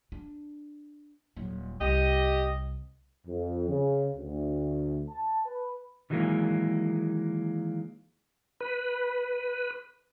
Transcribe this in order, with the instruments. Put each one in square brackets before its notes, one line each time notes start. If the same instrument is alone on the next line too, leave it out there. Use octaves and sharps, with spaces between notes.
[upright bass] D4
D#1 F#3
[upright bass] C2 [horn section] G4 D#5
[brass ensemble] F2
C#3
D2
A5
B4
[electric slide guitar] D#3 E3 F#3 G#3 A#3
[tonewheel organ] B4